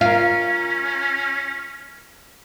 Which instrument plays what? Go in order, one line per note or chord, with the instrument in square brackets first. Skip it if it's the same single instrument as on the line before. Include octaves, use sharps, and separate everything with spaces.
[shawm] C#4 [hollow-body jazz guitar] F4 A#4 [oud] F5